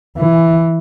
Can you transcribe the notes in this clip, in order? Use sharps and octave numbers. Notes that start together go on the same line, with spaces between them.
E3